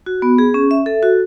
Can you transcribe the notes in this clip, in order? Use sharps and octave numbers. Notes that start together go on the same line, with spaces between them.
F#4
B3
G#4
C#4
E5
A4
F#4